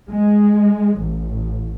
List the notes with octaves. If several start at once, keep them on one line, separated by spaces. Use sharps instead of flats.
G#3
A1